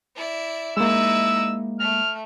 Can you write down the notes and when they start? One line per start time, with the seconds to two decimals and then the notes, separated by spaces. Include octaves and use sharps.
0.16 E4 D5
0.77 G#3 A#3 D#4 E4 E6
1.80 A3 F6